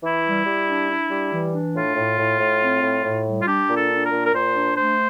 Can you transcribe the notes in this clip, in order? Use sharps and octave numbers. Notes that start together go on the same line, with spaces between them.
E3 E4
G3
G3
D4
D4
G3
E3
D4
A2 F4
A2
A2
A2
C4
A2
A2
G3
F4
D4 G4
A#2
A4
D4
A#4
A#2
A#4
A#2 C5
D4
A3 C5